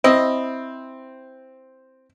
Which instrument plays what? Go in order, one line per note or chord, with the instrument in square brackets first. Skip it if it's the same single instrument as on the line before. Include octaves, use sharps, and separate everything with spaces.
[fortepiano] C4 [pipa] E4 D#5